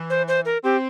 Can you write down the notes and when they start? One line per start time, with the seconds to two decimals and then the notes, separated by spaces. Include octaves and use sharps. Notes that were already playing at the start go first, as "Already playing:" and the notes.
Already playing: E3
0.10 C5
0.28 C5
0.45 A#4
0.64 C4 G4